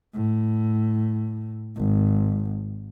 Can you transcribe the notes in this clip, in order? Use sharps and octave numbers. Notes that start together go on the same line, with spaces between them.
A2
G#1